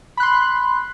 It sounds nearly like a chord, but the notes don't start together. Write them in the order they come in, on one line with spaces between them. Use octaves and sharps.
B5 F#6 C6